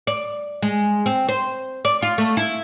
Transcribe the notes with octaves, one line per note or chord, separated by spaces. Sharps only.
D5
G#3
C4
C5
D5
F4
A3
E4